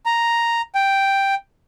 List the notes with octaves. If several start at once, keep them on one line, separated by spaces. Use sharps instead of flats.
A#5
G5